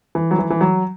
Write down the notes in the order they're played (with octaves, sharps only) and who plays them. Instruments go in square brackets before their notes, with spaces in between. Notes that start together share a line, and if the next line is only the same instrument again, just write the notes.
[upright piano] E3
F#3
E3
E3
F#3